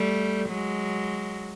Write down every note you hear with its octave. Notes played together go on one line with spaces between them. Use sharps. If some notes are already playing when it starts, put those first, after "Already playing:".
Already playing: G3 A3
F#3 G#3